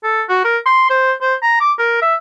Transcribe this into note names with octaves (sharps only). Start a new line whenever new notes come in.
A4
F#4
A#4
C6
C5
C5
A#5
D6
A#4
E5